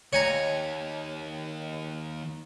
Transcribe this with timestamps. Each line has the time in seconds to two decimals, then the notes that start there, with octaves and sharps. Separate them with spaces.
0.13 D#2 C#5 G#5 A#5